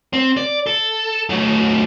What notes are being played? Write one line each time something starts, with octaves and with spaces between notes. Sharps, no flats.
C4
D5
A4
F#3 A3